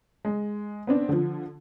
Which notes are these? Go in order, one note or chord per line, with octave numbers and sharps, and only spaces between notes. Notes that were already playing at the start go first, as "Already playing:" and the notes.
G#3
B3 C4 D4
D3 F3